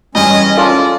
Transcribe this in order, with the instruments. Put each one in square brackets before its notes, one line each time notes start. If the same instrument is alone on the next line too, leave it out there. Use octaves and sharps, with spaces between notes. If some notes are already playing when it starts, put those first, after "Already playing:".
[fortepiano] G2 E3 [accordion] G#3 C#4 [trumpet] D#5
[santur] F4 [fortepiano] A4 A5 [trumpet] D5